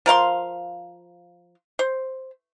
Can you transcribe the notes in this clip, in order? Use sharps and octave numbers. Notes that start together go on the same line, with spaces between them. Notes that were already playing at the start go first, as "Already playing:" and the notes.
F3 A#4 F5 C6
C5